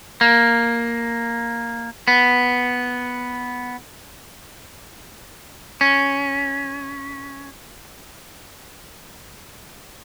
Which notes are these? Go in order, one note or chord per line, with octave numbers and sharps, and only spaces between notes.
A#3
B3
C#4